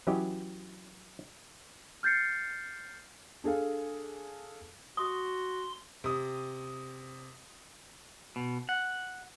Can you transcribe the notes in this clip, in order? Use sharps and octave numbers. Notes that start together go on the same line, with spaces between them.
E3 F#3 C#4 E4 G4 D#5
F6 G6 A6 C7 C#7
D4 G#4 A4 F5
F#4 C6 D#6
C3 D#6
B2
F#5